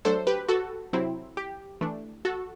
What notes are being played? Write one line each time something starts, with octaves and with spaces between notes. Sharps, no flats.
F#3 A3 D4 A4 C5
G4 B4
F#4 A4
C3 F#3 C4 E4
G4
E3 A3 D4
F#4 A4